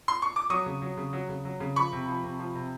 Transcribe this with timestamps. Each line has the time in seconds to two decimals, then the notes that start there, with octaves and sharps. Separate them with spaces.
0.08 C6
0.22 C#6
0.36 D6
0.50 F#3 C#6 D#6
0.66 C#3
0.82 F#3
0.97 C#3
1.13 F#3
1.29 C#3
1.45 F#3
1.60 C#3
1.76 F3 B5 C#6
1.92 C3
2.08 F3
2.24 C3
2.39 F3
2.55 C3